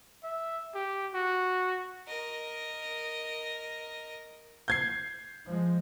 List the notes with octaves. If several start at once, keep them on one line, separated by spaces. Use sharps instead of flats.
E5
G4
F#4
A#4 D#5
G6 G#6 C7
F3 G#3